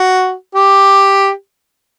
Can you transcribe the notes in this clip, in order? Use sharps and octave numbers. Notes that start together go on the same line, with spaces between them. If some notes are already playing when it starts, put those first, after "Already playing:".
Already playing: F#4
G4